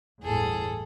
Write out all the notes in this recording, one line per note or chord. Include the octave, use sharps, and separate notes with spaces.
G1 E2 A2 G#4 A4